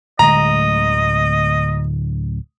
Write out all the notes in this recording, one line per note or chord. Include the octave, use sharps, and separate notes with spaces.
D1 D2 G#3 D#5 A#5